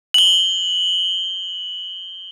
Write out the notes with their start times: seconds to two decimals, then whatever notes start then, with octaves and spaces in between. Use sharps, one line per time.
0.14 F#7 G7